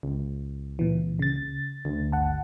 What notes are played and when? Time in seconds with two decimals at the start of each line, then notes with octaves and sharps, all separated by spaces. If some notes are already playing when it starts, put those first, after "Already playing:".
0.03 C#2
0.79 A#2 E3
1.19 C#3 A6
1.85 D2
2.12 G1 F#5 A5